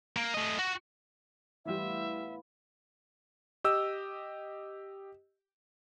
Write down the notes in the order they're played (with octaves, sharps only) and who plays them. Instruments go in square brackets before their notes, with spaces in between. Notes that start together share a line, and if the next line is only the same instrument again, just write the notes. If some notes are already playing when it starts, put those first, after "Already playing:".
[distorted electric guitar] A#3
A3 D#5
F#4
[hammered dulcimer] A2 B3 F4 [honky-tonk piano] E3 G3 [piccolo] E5
[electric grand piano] G4 D#5 E6